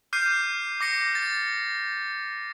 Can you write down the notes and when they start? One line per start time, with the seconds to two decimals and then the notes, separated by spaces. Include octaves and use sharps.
0.13 D6 F6 G6 C7 D#7
0.81 D6 A#6 C#7
1.15 A6